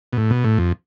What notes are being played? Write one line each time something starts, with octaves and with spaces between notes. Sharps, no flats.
B2
A2
B2
A2
F2